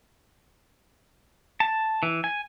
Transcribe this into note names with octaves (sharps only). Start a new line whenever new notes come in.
A5
E3
G#5